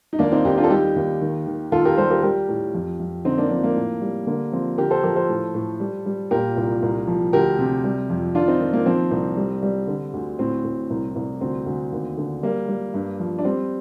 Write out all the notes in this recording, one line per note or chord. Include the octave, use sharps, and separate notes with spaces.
D#4
D#2 A#3 D4
C4 D#4
D#2 D#4 G4
D4 F4
A4
G3 D#4 G4
D#2
D#3
D#3
D#2 F4 A4
G4 A#4
G3 A4 C5
G4 A#4
G3 G4 A#4
A2
F2
F2
D3 C4 D#4
A#3 D4
F3 C4
A#3
A2
G3
D3 A#3
F3 C4
D3 G4 A#4
A4 C5
F3 G4 A#4
A4 C5
A2
A2
G3
G3
A#2 G4 A#4
C2
C2
F3
D2 G4 A#4
C3
G3
F2
D#3 D4 F4
C4 D#4
D#3
A#3
F3 C4
C2
G3
G3
D3
D2
A2 C4
A2
C2
C2
D2 C4
D2
D#2
D3
G3 A#3
G3
G2
F3
D4
G3 C4